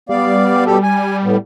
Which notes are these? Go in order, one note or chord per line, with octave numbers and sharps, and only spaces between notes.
G3 B3 D5 F5
B2 G4 A4
G#5
A2 B3